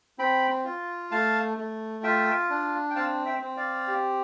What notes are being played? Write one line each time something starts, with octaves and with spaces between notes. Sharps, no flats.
C4 G5 B5
F4
A3 F5 A5
A3
F4 E5 G5
D4
G5
C4 F5 A5
E5 G5
C4
D5 F5
G4